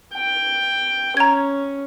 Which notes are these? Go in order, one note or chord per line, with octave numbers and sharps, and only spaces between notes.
G5
C#4 A#5 G#6